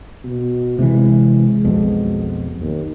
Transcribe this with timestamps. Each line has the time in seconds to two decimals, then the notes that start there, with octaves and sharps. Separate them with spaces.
0.24 B2
0.79 C3 E3 G#3
1.64 B1 F2 B2
2.61 D#2